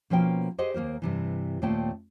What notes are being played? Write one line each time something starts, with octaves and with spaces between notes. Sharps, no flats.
B2 F3 A#3 C#4 G5
G4 G#4 C5 D#5 F#5
D#2 A#3 A#4 C5
G2 C3 E3
D#2 A#2 A3 C4 G5 A5